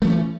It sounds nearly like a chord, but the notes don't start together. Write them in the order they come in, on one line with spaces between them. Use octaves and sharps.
A3 F3 C#4 E3